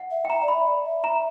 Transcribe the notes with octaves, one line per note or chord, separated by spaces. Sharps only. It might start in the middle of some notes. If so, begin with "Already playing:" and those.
Already playing: F#5
E5
G5
E5 A#5
D5
B5
E5
D5
E5
A#5